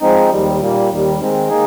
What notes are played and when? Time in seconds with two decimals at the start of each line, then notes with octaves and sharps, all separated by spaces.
0.01 F3 G#3 C4 D#4
0.30 D#2 D#3 G3
0.59 A#2 G3 A#3
0.90 D#2 D#3 G3
1.19 D#3 G#3 C4
1.49 D#3 A#3 D#4 G#4